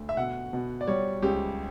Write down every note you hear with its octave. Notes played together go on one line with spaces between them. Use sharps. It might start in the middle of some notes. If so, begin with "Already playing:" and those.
Already playing: D2
E5
B2 F#5
B2
D5
G3 C#5
C#2 G4